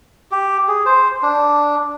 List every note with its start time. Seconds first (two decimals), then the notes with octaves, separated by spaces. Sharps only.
0.31 G4
0.68 G#4
0.86 C5
1.23 D4